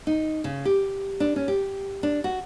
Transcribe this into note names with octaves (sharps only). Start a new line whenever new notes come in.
D#4
C#3
G4
D4
C#4
G4
D4
F#4